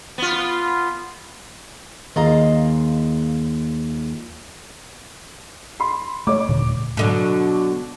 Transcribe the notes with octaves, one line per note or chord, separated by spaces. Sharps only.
B3 F4
D#2 F4 G#4 D#5 F5 A#5
B5 C6
A3 C#5 D6
D#1 A#2 D3
B2 D3 F#3